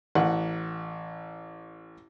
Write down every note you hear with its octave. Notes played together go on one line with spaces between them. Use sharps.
A1 F#5